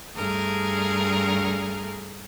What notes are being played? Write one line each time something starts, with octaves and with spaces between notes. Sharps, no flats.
G2 A3 G#4 A#4